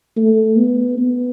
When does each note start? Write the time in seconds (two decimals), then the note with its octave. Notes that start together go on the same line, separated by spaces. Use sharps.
0.16 A3
0.58 B3
0.98 B3